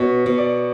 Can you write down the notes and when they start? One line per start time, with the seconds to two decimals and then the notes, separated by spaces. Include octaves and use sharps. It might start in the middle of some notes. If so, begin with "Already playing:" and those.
Already playing: B2 C#5
0.26 B2
0.38 D5